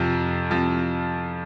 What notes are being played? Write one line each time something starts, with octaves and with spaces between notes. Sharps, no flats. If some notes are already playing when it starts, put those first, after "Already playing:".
Already playing: F2 C3 F3
C3 F3